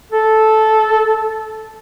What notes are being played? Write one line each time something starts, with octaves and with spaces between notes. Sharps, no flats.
A4